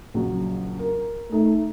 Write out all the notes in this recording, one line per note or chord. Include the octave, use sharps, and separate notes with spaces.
A#1 C#3 F#3
A#4
A3 D#4